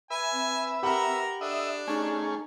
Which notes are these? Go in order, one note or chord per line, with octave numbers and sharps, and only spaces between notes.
B4 E5 G#5
C4
G4 A#4 F#5 B5
D4 A4 D#5 E5
A3 C#4 D#4 G#4